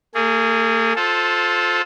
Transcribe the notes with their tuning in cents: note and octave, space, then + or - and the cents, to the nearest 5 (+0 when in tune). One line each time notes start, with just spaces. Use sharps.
A#3 -45 G#4 +0
F4 +20 A4 -10 C5 +0